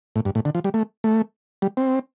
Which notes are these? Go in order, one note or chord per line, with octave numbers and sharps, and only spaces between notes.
A2
G2
A2
D3
F3
G3
A3
A3
G3
C4